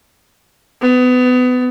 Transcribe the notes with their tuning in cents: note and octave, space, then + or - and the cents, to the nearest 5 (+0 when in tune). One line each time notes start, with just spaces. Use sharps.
B3 +25